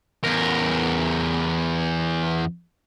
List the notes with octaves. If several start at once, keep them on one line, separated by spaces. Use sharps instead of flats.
E2 A#4